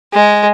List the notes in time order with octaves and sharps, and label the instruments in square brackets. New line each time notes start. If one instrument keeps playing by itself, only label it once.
[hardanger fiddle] G#3